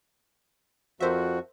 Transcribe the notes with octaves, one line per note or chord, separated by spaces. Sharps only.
F2 F3 F#4 A#4 C5 E5